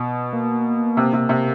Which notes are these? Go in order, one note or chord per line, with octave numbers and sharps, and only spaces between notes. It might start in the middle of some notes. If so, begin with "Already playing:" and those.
Already playing: B2
A#3
C3
C3
C3